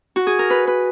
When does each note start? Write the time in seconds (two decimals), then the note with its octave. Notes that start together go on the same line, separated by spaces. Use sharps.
0.16 F#4
0.27 G#4
0.39 A#4
0.50 B4
0.67 B4